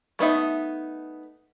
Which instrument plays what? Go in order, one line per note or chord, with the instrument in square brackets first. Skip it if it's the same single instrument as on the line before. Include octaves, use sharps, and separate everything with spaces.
[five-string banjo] A3 B3 D#4 E5